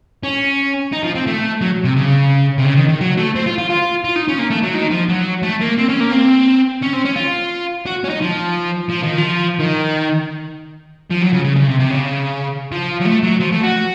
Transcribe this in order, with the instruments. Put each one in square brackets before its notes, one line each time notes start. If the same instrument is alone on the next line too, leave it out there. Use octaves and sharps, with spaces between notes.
[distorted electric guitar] C#4
D#4
F3
C4
A3
F#3
C3
C#3
C3
C#3
D#3
D#3
F#3
A3
C4
F4
F4
F4
F4
D#4
C#4
A#3
A3
F#3
D#3
F3
F#3
A3
A#3
C4
C#4
A#3
C4
C#4
C4
C#4
F4
F#4
C#4
D#4
F3
F3
D#3
F3
D#3
F3
F#3
C#3
C#3
C#3
C3
C3
C#3
F3
F#3
A3
F#3
F3
A3
F#4